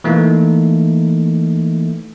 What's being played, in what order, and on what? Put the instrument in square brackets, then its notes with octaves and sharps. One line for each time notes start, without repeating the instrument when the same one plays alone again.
[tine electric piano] E3 A3 A#3 D#4 E4